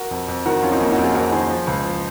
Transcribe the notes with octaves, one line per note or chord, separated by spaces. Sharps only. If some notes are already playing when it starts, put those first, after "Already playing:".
Already playing: F#4 A#4
F2
F2
D#3 F#4 A#4
F2 C#4 F4
C4 D#4
F2 A#3 C#4
D#4 F#4
F2
F4 G#4
F2 F#4 A#4
D#3 G#4 C5
F3
C#2
F3